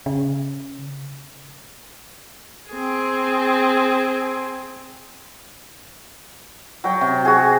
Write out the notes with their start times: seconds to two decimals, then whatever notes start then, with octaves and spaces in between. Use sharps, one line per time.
0.06 C#3
2.70 C4 G#4
6.84 F#3 G5
7.01 C3
7.25 F#4 G#4